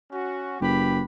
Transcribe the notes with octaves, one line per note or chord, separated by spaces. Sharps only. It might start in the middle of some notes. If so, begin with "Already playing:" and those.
C#4 F#4
F#1 G4 B4 B5